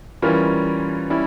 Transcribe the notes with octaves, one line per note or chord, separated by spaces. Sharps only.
E3 G3 C#4 F4 A#4
G3 C#4 E4